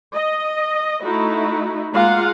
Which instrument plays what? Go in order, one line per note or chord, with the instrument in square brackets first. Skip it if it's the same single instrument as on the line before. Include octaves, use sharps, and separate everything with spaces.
[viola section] D#5
A3 D#4 E4 F#4
G#3 A#3 F4 F5 F#5